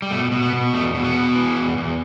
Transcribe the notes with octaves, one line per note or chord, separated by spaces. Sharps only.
G3
B2 A3
B2
B3
B2
E2 A3
B2
B3
B2
E3
E2
E2